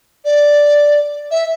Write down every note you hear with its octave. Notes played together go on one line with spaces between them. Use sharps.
D5
E5